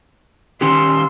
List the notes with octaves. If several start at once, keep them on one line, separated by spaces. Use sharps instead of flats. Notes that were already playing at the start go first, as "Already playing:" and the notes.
D#3 C#4 G4 C6 E6